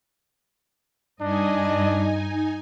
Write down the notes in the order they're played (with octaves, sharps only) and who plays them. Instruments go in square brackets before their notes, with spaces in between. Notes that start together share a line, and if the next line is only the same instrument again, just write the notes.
[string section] G2 D#5 [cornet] D4 [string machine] D#4 G#5